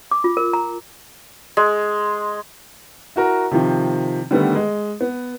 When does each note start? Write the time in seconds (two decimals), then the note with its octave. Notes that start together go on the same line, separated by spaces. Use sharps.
0.11 D6
0.24 F4
0.37 A#4
0.53 A#5
1.57 G#3
3.16 E4 F#4 A#4
3.51 C3 D#3 F3
4.31 D3 D#3 G3 A3 B3
4.55 G#3
5.01 B3